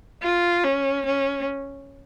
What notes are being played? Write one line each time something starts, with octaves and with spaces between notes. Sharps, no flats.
F4
C#4
C#4